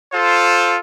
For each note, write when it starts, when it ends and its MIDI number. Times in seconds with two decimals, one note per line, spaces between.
0.12 0.76 65
0.12 0.76 69
0.12 0.76 72